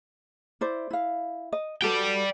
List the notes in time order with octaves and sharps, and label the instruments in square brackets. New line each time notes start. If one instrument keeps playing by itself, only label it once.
[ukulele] E4 C5 D5
E4 F5
D#5
[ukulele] F#4 A4 B4 [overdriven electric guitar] D5 G5